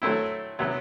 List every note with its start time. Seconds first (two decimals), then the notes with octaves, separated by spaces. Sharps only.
0.02 F#3 A3 C4 E4
0.59 C3 F#3 B3